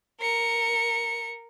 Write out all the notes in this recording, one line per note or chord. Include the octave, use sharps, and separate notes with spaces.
A#4 C#7